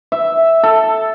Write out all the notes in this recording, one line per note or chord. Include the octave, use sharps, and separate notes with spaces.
E5
A4